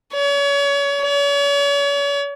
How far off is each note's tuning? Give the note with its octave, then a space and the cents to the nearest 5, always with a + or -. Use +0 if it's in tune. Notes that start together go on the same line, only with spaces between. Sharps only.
C#5 +35
C#5 +40